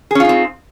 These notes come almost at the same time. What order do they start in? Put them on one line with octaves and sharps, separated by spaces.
G#4 C#4 F4 D#4 C4